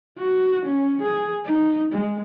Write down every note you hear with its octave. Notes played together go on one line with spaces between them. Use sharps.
F#4
C#4
G#4
D#4
G#3